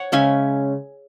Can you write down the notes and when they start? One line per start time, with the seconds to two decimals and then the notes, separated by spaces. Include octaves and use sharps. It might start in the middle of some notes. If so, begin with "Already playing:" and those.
Already playing: C#5 F#5
0.12 C#3 G#3 C#4 E5 G#5